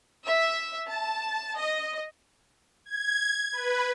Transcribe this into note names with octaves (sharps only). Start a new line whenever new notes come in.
E5
A5
D#5
G#6
B4